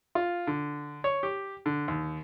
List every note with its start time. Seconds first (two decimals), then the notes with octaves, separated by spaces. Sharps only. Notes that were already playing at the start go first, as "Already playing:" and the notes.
0.15 F4
0.47 D3
1.04 C#5
1.23 G4
1.66 D3
1.88 D#2